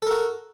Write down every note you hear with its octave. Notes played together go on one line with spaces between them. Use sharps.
F#4 A4 A#4